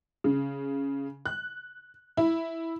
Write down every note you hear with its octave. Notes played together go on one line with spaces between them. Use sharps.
C#3
F#6
E4